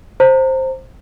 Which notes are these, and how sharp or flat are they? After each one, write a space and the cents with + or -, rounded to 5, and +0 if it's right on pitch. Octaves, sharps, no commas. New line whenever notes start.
C5 +10 A#5 -30